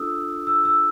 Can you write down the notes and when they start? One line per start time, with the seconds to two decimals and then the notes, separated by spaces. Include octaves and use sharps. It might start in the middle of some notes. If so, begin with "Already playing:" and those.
Already playing: D4 F4 A4 D#6 E6
0.47 E6
0.65 E6